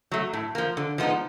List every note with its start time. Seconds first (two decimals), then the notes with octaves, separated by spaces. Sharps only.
0.12 F#3 A3
0.33 A2
0.55 F3 A#3
0.77 D3
0.98 F3 G#3 B3 D#4